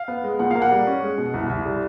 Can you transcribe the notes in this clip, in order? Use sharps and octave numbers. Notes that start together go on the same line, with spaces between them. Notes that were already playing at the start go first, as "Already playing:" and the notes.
Already playing: F5
B3
G#3
A#2 F#5
A#3 F5
F#5
G3
C#4
G#3
B2
C2
C2
G3